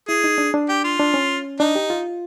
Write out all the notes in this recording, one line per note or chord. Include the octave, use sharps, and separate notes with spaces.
E4 G#4
D#4
D4
D4
G4
F4
D4
C#4
D4 D#4
G4
F4